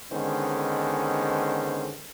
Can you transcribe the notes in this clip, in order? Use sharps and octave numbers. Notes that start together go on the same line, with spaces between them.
D3 D#3 G#3 B3 C#4 C5